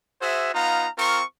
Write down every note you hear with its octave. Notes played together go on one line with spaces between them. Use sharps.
F#4 G#4 C5 E5
B3 D#4 F4 F5 A#5
C4 F4 A#4 C#6